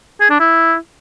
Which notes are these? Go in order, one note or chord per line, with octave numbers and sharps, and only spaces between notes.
G#4
D4
E4